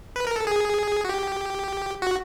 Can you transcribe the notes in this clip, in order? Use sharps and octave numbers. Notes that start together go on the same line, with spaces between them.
B4
A#4
A4
G#4
F#4
G4
F#4